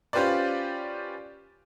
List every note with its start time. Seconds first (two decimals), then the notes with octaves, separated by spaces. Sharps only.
0.13 C#4 F4 G4 B4 C5 D5